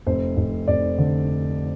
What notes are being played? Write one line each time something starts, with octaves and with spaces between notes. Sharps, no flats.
F1 C5
F1
F1 D5
D3